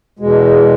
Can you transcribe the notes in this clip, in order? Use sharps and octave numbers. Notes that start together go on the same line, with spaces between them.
E2 B2 G#3